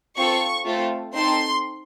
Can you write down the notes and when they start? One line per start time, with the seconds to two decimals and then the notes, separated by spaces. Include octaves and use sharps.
0.17 C4 F4 A4 C#6
0.65 A3 C4 F4 A4
1.13 C4 D#4 A4 C6